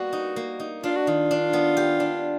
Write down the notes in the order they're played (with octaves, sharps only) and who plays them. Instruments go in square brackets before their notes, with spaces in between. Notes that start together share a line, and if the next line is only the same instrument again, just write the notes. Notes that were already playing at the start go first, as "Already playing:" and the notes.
Already playing: [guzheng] G3 A#3 B3 [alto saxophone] F#4
[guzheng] D#4
A#3
D#4
[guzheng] D4 [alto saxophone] F4
[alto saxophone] F#4
[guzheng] D#3 [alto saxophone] F4
[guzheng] D4
B3
G4
D4